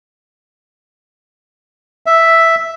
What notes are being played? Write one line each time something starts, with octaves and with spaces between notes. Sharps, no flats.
E5